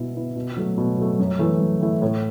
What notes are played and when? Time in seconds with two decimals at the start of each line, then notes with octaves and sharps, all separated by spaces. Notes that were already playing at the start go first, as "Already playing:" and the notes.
Already playing: B2 B3 E4
0.15 B3 E4
0.36 B2
0.57 F#3 A3
0.78 B2
0.98 F#3 A3
1.19 F#2
1.39 E3 A3 E4
1.60 F#2
1.81 E3 A3 E4
2.02 A2